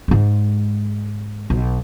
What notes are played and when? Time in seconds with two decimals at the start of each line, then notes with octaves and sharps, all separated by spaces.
0.08 G#2 G#3
1.50 B1